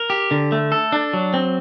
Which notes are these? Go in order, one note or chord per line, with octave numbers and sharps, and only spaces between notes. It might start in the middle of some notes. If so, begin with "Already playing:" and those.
Already playing: A#4
G4
D3
A3
A4
D4
F#3
C4